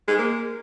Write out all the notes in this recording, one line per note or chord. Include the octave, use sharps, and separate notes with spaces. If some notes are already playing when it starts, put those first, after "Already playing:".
G#3
A#3